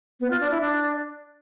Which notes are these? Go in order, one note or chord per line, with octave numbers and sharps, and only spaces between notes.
B3
F4
D4
E4
D4